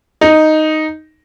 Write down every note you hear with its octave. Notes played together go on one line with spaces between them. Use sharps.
D#4